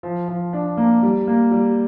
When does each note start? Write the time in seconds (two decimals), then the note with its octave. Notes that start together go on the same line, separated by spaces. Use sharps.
0.03 F3
0.28 F3
0.53 D4
0.77 A#3
1.03 G3
1.28 A#3
1.52 G3